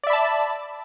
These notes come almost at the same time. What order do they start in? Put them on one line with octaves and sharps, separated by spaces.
D5 E5 B5 A5